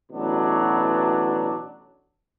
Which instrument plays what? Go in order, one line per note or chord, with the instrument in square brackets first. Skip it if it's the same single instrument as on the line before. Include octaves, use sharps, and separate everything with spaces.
[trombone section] A1 B2 F#3 D4